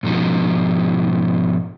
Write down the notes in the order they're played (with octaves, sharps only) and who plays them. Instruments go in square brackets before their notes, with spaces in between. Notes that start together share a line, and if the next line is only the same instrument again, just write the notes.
[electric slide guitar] G#2 B2 D#3 F3 D#4